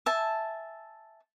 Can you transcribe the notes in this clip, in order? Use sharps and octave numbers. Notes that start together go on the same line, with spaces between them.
E5 G#5 A5